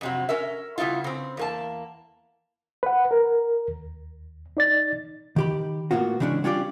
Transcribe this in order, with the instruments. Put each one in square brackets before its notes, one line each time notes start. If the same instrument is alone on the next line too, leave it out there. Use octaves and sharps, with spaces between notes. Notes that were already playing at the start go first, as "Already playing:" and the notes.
[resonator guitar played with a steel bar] F2 C3 F#3
C#4 A#4 E5
C#3 G3 B3 E4 F4
C#3 C4
E2 A#3 A5
[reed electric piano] B4 F#5
A#4
D#2
D#4 D5 A6
[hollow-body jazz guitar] D#3 G4 B5
A2 A#3 B3 F4 F#4
C#3 E3 G#3 C#4 D4
G3 C#4 D4 F4 G4 D5